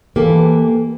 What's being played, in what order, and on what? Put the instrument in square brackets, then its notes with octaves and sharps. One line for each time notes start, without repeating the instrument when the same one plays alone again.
[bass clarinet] E3 [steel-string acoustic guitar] A#3 [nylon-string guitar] G4 A4